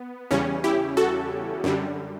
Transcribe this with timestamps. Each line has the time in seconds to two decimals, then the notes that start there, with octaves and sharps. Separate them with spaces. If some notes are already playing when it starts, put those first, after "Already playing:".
Already playing: B3
0.31 E2 C#3 G3 C#4
0.64 E4 G4
0.97 F#4 A4
1.64 F#2 D3 G3